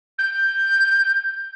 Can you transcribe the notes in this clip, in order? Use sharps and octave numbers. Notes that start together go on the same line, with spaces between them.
G6